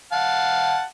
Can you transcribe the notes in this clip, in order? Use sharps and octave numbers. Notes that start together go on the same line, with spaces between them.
F5 F#5 A5